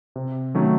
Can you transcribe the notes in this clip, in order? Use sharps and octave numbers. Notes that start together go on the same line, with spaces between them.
C3
D#3 F#3 A3 C#4